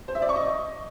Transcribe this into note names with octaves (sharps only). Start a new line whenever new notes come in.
C5
E5
D5
C#6
D#5